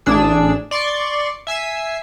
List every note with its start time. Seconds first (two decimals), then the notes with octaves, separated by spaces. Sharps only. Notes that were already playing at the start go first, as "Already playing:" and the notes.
0.06 A1 D4 G#4 E6
0.71 D5 C6 C#6
1.47 E5 G#5 E6 C7